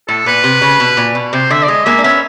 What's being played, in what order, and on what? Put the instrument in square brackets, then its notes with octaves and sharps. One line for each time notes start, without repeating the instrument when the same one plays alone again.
[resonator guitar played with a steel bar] A2 [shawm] A4
[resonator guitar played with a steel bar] A#2 [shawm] B4
[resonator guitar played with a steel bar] C3
C#3
B2
A#2
B2
[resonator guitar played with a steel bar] C3 [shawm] C5
[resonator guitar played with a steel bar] D3 [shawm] E5
[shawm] D5
[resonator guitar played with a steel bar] G#3 [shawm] D#5
[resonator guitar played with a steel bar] G#3 A#3 [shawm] E5
[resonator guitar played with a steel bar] D4
[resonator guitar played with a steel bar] B3 C#4 [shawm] E5